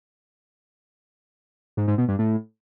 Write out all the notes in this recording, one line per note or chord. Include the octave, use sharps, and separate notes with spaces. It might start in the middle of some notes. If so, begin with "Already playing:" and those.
G#2
G#2
B2
G2
A2